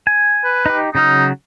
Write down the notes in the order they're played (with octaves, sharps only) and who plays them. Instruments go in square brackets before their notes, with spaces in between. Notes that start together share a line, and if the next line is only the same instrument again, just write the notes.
[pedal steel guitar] G#5
[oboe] B4
[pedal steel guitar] D#4 G4
[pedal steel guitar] C#3 F#3 F6 [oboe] D#4